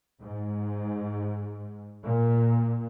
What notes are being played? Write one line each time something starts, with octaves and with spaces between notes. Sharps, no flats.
G#2
A#2